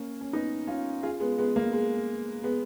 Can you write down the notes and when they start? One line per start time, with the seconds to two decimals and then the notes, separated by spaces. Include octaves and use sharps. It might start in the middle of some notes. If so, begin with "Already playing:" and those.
Already playing: A#3 C#4
0.21 C#4
0.33 B3 D#4
0.67 C#4 F4
1.03 F4 G#4
1.20 G#3 B3
1.38 G#3 B3
1.56 A#3
1.73 G#3
2.43 G#3 B3